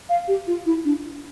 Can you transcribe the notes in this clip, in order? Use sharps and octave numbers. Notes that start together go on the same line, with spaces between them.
F5
G4
F4
E4
D4